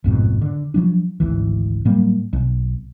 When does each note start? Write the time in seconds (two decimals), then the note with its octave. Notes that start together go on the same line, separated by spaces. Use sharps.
0.04 A1 F2 G#2 B2
0.42 D3
0.74 F3 F#3 D4
1.20 G#1 D2 E3
1.85 A2 F#3 G3 A#3
2.33 B1